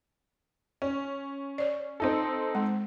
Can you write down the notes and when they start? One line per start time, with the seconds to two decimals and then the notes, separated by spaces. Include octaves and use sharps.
0.82 C#4
1.58 C#5 D5
2.00 C4 D#4 A4
2.55 G#3